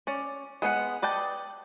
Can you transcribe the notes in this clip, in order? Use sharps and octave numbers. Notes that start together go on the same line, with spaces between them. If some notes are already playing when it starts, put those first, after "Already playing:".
C#4 D5
G#3 B3 C5 F#5
B4 D5 D#5 G5 A5